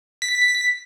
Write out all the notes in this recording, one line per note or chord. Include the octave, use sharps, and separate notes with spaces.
B6